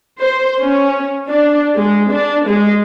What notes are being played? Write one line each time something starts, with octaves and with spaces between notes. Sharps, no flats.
C5
C#4
D4
G#3
D4
G#3